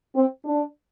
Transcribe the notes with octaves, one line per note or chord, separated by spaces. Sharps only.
C4
D4